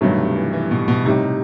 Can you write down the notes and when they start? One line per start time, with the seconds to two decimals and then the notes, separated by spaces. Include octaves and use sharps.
0.01 G2 B2 D#3 F#3 A3
0.18 C3
0.36 E3
0.53 E3
0.71 B2
0.88 B2
1.05 A2 C3 G3 D#4